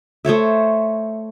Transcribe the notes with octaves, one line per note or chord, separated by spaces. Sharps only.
A3 C5 C#5 E5